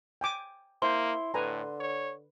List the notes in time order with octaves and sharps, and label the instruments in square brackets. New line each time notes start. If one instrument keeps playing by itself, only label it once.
[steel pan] G5 G#5 D6
[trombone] A#3 [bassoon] E4 [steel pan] C5 [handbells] C6
[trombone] A2 [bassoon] D3 [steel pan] B4 G#5 A#5
[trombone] C#5